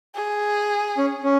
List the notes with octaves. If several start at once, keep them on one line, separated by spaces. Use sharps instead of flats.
G#4
C#4
C#4